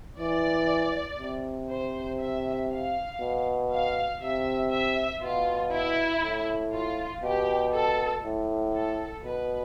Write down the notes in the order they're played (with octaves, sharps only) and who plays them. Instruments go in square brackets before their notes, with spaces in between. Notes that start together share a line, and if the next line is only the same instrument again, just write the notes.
[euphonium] E3 [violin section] D5
[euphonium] C3
[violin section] C5
E5
F5
[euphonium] B2
[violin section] F5
[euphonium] C3 [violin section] E5
[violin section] E5
[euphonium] B2 [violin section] F4
[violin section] E4
[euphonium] A2
[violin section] F4
[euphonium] B2 [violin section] G4
[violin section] A4
[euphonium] A2
[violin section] A4
[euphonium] B2 [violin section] B4